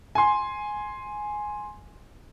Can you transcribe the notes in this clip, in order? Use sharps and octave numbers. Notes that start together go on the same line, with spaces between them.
G#5 C6